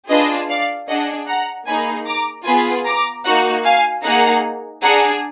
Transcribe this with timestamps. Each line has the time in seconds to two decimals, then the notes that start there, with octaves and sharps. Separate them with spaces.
0.09 D4 F4 G#4 B4 D#5
0.49 D5 F5
0.88 D4 G#4 D#5 F#5
1.27 F#5 A#5
1.66 A#3 D#4 G#4 G#5 B5
2.06 A#5 D6
2.46 B3 F4 G#4 G#5 B5
2.85 A#5 D6
3.24 A#3 D#4 F#4 F#5 A#5
3.64 F5 G#5
4.04 A#3 D#4 G#4 F#5 A#5
4.82 D4 G#4 F#5 A#5